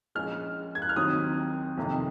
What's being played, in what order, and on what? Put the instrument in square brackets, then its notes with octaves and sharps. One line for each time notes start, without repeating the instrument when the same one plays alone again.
[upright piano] A#1 A#2 G#3 C#4 F6
G#6
F#6
F6
D#2 D#3 F#3 C4 D#6
F2 C3 D#3